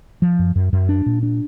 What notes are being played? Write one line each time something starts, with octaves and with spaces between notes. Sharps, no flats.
F3
F#2
F#2
F#2
D4
A#2
D4